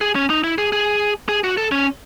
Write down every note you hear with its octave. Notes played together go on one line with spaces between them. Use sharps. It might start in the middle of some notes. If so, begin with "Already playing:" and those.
G#4
C#4
D#4
E4
G#4
G#4
G#4
F#4
A4
C#4